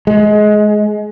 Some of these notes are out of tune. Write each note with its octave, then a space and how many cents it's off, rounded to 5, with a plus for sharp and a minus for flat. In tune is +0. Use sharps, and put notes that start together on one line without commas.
G#3 +20